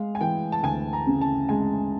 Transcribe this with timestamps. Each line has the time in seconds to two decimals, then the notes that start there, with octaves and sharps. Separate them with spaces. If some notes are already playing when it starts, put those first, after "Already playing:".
Already playing: G#3 F5
0.15 G#5
0.21 E3 G5
0.52 A5
0.63 D2 G#5
0.93 A#5
1.07 C#3
1.21 A5
1.49 G#3 G#5